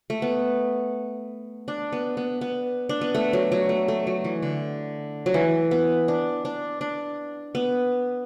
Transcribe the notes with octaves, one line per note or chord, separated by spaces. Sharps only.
A3
B3
D4
B3
B3
B3
D4
B3
A3
F#3
F#3
A3
A3
F#3
E3
D3
F#3
E3
B3
D4
D4
D4
B3